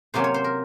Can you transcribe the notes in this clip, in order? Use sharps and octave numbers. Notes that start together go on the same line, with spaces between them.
C3 F#3 A#3 C#4 C5
C#5
C5
A#4